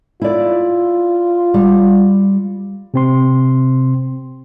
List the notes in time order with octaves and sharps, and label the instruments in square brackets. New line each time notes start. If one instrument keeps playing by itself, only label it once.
[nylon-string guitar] E4 D5 [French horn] F4
[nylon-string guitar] G3
[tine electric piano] C3 C4 C6